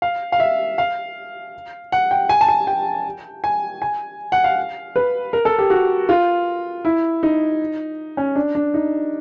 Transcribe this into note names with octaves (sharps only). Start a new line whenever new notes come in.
F5
F5
E5
F5
F#5
G5
G#5
A5
G#5
G5
G#5
G#5
F#5
F5
B4
A#4
A4
G4
F#4
F4
E4
D#4
C#4
D4
D4
D#4